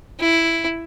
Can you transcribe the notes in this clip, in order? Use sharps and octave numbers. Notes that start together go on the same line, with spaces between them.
E4